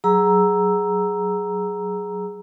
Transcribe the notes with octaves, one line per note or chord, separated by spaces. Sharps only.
F#3 G#4 A#5 E6